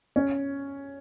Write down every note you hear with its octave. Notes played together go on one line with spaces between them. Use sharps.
C#4